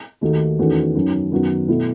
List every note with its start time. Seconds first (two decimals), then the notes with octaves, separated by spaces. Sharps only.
0.21 D#2 D#3 A3 D#4 F#4
0.59 E2 D#3 A3 C#4 F#4
0.94 F#2 D#3 F#3 C#4
1.31 F#2 D#3 F#3 B3 F#4
1.68 B2 A3 E4